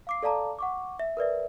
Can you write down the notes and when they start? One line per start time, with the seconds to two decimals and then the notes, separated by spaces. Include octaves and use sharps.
0.07 F5 D6 C7
0.23 A4 D5 F5 A5 A#5 D6
0.59 F#5 C#6 D6
0.99 E5
1.17 A#4 B4 D5 E5